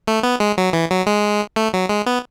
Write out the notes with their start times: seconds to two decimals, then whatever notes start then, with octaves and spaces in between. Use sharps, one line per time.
0.07 A3
0.23 B3
0.40 G#3
0.58 F#3
0.73 E3
0.90 F#3
1.06 G#3
1.56 A3
1.73 F#3
1.89 G#3
2.06 B3